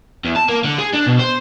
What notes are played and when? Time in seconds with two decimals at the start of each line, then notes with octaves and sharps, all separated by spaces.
0.24 E2
0.36 A5
0.49 A#3
0.64 D3
0.78 G#4
0.93 D4
1.06 B2
1.19 C5